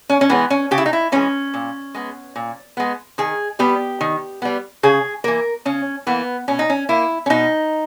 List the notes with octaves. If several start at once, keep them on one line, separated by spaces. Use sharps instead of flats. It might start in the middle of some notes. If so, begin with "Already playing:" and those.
C#4
C#4
E3 G#3 B3
C#4
C#3 G4
E4
D#4
E4
E3 G#3 C#4
A#2
G#3 B3
A#2
G#3 B3
D#3 G#4
G3 B3 G4
D#3
G3 B3
C#3 G#4
E3 A#3 A#4
C#3 C#4
E3 A#3 B3
B2 C#4
D#4
C#4
A#3 E4
C#4
B2 D#4